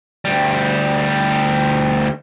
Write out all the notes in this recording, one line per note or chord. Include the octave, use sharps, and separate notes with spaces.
D2 G3